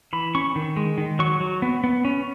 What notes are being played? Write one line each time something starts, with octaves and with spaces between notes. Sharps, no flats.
E3 B5
C#4 C#6
D#3
G#3
D#3
F#3 C#6
F#3
B3
B3
C#4